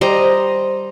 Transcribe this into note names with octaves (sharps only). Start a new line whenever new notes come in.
G3 C5 D#5 A#5